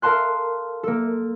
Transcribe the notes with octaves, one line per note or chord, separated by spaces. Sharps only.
A4 A#4 F5 A5 C6 F#6
A#3 A4